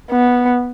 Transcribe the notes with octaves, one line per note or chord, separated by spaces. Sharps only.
B3